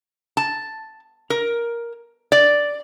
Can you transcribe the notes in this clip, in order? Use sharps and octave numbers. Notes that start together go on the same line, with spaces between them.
A5
A#4
D5